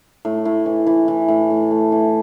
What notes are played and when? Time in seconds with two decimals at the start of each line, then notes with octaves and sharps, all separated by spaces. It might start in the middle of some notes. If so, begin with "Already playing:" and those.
0.25 A2
0.45 A2
0.66 E3
0.87 E3
1.08 E3
1.28 A2
1.50 A2
1.71 A3
1.92 E3